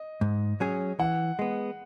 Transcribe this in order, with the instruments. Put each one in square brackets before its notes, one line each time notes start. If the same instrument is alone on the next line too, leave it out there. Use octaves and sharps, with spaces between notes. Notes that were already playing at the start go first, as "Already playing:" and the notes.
Already playing: [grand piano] D#5
[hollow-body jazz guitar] G#2
F#3 C#4 G#4
[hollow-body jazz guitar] E3 [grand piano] F#5
[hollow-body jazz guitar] G#3 B3